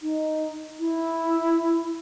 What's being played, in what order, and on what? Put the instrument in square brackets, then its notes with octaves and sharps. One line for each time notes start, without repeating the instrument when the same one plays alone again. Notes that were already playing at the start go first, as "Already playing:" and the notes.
[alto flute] D#4
E4